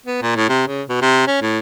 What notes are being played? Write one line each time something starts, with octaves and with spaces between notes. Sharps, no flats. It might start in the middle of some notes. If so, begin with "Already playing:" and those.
B3
A#2
A2
C3
C#3
B2
C3
C#4
A2